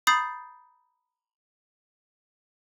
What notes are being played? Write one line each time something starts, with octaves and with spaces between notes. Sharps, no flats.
A#5 B5 D#6 G6 A6 C7